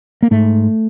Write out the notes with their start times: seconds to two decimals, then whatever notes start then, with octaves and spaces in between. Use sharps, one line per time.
0.23 A#3
0.31 G#2 A3